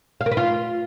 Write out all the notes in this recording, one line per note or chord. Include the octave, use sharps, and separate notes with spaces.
F5
A#4
B4
F4